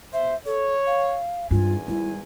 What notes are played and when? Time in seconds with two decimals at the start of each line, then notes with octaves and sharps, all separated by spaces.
0.13 B2 C5 E5
0.46 A4 C#5
0.86 F5
1.51 G#1 E2 G2 F4 G#5
1.88 G3 E4